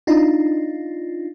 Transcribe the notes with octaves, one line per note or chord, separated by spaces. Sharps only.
D4 D#4 F4